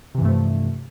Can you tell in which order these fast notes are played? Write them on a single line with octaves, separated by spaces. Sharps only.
C3 E3 G2 A3 F3